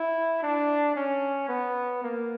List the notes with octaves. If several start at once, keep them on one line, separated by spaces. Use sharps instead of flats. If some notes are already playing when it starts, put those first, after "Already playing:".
Already playing: E4
D4
C#4
B3
A#3